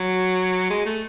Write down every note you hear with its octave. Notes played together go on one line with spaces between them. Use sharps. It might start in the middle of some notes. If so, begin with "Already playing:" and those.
Already playing: F#3
G#3
A3